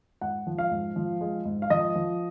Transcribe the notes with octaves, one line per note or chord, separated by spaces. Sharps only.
G#2 F#5
F3
F5
G#2
F3
G#3
G#2
F5
F3 D#5
F3